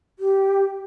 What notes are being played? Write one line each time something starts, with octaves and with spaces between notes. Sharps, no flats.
G4